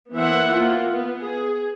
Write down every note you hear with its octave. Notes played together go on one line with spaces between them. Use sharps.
E3 A#3 B3 C5 E5 F#5
A#3 F4
B3
G#4